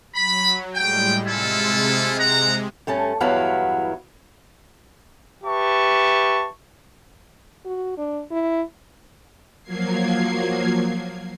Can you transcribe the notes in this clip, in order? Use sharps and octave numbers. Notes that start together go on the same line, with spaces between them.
F#3 B5
A2 G3 G#3 G5
C3 G#3 E4 F4 A4
F#5 A#5
G2 A3 C#4 A5
E2 G2 F#3 E4 B4 F5
G4 B4 E5 A5 C#6
F#4
D4
E4
F3 F#3 A#3 G#6 C7